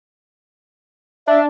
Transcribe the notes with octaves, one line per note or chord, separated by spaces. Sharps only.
D4 E5